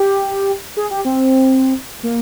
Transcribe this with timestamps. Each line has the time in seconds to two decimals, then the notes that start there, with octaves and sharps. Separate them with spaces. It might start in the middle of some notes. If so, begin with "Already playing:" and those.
Already playing: G4
0.77 G#4
0.91 G4
1.05 C4
2.03 A#3